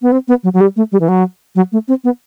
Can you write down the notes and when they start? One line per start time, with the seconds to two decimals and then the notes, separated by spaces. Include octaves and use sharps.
0.02 B3
0.12 C4
0.28 B3
0.44 F#3
0.54 F#3
0.61 G3
0.76 A3
0.92 G3
1.00 E3
1.08 F#3
1.55 F#3
1.72 A3
1.88 C4
2.04 B3